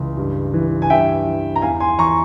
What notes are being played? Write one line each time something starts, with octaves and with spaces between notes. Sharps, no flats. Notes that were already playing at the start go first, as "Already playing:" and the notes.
Already playing: C#2 E3
G2
E3
G#5
G2 E5 G5
E3
A#5
E2 F5 G#5
G#5 C6
E3 A#5 C#6